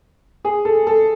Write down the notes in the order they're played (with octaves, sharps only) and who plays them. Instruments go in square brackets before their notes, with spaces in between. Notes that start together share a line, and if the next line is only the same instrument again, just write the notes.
[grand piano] G#4
A4
A4